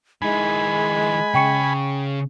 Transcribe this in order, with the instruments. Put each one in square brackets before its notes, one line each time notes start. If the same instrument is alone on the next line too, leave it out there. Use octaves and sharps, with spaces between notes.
[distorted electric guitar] D#3 E4 [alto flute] G#3 [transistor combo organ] G#5 B5
[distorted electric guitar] C#3 [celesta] G5 C#6 C#7